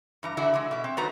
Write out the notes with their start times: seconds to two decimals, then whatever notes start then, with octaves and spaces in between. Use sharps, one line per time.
0.23 G2 E3 A#5
0.37 D3 E3 D4 E4 F#4 E5
0.54 D3 E3 G#3
0.71 B2 E5
0.84 C4
0.97 D#3 F#3 A3 F#4 B4 A#5